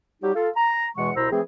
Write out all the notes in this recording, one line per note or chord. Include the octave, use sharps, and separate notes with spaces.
F#3 G3 D#4 G4
F4 A4
A#5
E2 B2 E3 G#3 F#5 C#6
C2 B2 E4 C5 A#5 E6
E3 F3 A3 C4 G#4